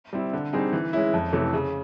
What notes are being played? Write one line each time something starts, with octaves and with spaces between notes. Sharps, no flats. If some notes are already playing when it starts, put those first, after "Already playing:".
G3 C4 E4
D3
G3 C4 D#4 G#4
E3
G#3 C#4 E4
F2
C3 E3 A3 C#4
C#3